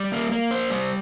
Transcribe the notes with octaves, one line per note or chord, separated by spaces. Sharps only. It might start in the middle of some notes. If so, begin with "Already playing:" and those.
Already playing: G3
A#3
A#3
C5
G3